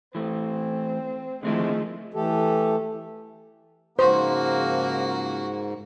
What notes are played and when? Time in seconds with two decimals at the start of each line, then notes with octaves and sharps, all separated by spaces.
0.15 E3 A3 C4
1.43 D3 D#3 F3 G#3 A3 C4 E4
2.14 E3 A3 G4 A4
3.99 G#2 C#3 F3 A#3 F#4 C5